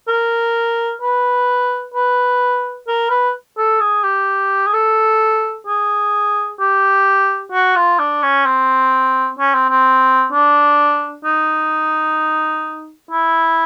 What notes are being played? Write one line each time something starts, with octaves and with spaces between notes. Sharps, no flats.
A#4
B4
B4
A#4
B4
A4
G#4
G4
G#4
A4
G#4
G4
F#4
F4
D4
C#4
C4
C#4
C4
C4
D4
D#4
E4